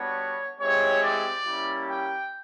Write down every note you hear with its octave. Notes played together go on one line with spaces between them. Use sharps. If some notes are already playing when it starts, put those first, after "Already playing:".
Already playing: G3 B3 D4 F#4 C#5
G#3 C4 E4 G4 C#5
D5
G3 A#3 C#4 E4 G4
G5